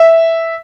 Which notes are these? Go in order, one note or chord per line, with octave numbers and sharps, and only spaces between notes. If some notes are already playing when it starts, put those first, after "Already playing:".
Already playing: E5